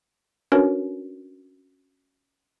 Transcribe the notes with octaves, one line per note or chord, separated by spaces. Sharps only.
C#4 D4 F#4 A#4 B4 C#5